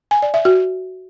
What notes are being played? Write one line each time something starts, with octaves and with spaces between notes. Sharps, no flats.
G#5
D5
E5
F#4